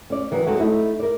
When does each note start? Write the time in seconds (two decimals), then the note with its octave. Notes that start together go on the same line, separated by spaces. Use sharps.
0.10 C#4 D5
0.31 D#3 E3 F#3
0.47 F#3 G#3 C4 D#4 F#4 A4
0.60 A3 D#4 E4
1.00 A#4 D5